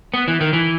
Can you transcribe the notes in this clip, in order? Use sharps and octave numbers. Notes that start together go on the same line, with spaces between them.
B3
E3
D#3
E3